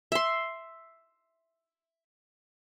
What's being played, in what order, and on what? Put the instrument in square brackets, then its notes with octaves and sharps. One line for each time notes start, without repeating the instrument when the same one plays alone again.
[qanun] E5 C6